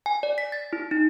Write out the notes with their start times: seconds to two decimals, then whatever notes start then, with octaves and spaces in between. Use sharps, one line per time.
0.06 G#5
0.23 D5
0.38 B6
0.52 A6
0.73 E4
0.91 D#4